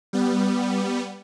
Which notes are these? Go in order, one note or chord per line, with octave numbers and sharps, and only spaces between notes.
G3 B3